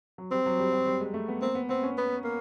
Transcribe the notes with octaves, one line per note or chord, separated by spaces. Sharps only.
F#3
G3 C4
F#3
G3
F#3
G3
G#3
A3
B3
A#3 C4
B3
B3 C4
C#4
B3
A#3